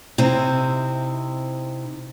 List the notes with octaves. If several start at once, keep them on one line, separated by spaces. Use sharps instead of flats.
C3 C4 D#4 E4